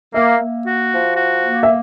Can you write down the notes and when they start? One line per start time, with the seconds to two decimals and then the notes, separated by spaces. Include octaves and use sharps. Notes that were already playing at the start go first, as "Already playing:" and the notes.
0.14 A#3 E5
0.40 A#3
0.66 F#4
0.91 F3
1.16 F#4
1.43 A#3
1.63 E5